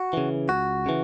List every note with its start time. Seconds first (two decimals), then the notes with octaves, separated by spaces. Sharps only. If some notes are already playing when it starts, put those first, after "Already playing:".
Already playing: F#4
0.13 C#3 E3
0.49 C#2 F#4
0.86 C#3 E3